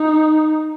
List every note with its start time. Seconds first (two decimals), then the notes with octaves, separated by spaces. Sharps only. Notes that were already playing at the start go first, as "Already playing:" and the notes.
Already playing: D#4